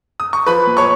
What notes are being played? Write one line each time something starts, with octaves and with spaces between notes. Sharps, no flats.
D#6
C#6
F3 B4 B5
A#2
C#5 C#6